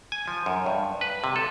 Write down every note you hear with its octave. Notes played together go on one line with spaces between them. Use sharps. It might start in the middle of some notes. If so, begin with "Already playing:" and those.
G#5
F3
F#2
G2
B4
C3
A4